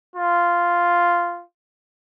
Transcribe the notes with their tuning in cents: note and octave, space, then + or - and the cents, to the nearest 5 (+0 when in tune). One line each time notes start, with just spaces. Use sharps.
F4 -5